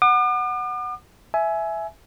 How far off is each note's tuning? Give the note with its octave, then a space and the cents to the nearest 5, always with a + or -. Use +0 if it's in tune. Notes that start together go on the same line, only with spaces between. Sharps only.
F#5 +0 D6 +45
E5 +0 G#5 +20